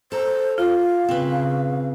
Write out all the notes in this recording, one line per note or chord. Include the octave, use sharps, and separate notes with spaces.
A4 C5 A#5
F4 F5
C#3 C4 B4